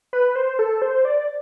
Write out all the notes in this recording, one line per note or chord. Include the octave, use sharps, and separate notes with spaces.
B4
C5
A4
C5
D5